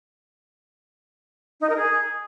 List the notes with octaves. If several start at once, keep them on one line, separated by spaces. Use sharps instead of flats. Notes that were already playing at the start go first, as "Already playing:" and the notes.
D#4
A#4
G#4